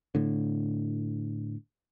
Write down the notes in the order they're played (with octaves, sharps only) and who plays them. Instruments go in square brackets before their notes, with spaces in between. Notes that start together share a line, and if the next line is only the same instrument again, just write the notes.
[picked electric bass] A2 D3